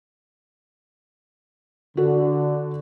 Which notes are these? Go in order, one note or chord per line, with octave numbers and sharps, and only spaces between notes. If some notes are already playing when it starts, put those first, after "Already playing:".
D3 F#4 A4